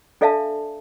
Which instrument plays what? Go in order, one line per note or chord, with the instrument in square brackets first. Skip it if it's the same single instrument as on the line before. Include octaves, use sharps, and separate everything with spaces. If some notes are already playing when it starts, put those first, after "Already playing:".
[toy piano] D4 A4 D5 E5 F5 A5